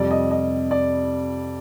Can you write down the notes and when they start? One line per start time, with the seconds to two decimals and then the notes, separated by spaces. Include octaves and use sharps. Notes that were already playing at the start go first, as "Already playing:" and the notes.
Already playing: F2 C3 G3 D5
0.11 D#5
0.31 D#5
0.71 D5